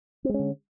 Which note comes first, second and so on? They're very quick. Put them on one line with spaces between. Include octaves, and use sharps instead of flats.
C4 G#3 C#4 D3